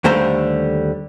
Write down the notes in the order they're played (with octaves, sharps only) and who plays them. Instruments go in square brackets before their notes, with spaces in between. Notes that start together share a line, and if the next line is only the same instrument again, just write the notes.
[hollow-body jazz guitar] D#2 D3 G3 A3 C5 A#5